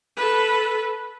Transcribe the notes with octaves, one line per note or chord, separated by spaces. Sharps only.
A4 B4